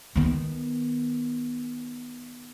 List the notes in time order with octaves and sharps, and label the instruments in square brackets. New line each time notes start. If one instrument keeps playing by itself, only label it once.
[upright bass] D#3 B3